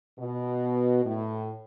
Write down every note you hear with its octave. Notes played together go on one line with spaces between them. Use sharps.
B2
A2